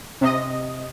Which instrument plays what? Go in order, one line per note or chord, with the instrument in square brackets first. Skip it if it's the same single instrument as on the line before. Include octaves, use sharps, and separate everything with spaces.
[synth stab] C3 D#5